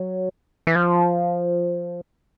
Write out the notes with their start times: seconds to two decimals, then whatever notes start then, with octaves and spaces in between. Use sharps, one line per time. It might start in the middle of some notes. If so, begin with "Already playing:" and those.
Already playing: F#3
0.67 E3
0.75 F3